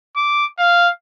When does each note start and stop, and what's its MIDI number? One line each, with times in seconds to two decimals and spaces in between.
0.16 0.45 86
0.59 0.90 77